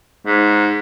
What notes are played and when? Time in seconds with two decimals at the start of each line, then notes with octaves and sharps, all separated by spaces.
0.26 G#2